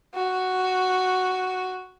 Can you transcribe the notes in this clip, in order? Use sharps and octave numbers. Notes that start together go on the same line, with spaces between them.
F#4